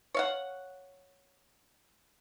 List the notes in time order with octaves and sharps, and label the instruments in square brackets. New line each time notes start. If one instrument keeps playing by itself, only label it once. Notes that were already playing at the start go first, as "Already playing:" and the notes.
[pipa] C#5 F5 F#5